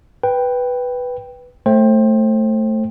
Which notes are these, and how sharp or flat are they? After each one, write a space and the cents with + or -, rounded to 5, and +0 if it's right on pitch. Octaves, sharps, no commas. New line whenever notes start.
B4 +0 G5 +0
A3 +0 C5 +25 G5 +0